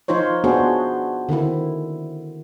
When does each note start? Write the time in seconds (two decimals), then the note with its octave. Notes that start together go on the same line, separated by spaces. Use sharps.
0.08 F3 D#4 F4 C5 C#5
0.44 B3 D4 F#4 G#4 C5 C#5
1.29 D3 D#3 C4 E4